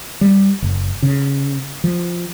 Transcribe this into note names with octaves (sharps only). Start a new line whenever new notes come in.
G3
F#1
C#3
F3